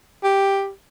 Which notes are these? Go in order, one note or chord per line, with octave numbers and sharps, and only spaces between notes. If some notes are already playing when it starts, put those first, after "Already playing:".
G4